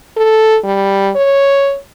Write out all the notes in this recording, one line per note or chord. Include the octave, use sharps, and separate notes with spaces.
A4
G3
C#5